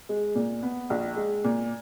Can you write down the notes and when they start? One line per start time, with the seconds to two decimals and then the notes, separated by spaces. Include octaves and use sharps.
0.09 G#3
0.35 A#2
0.63 B3
0.90 A#1
1.16 G#3
1.44 A#2